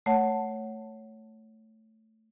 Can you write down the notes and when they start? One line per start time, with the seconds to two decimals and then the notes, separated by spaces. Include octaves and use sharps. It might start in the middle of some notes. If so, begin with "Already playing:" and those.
0.06 A3 C#5 F#5 A5